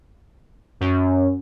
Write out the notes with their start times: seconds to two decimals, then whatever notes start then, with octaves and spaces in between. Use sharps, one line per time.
0.81 F#2